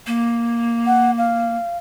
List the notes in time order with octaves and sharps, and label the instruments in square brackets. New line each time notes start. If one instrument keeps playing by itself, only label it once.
[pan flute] A#3
[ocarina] F#5
F5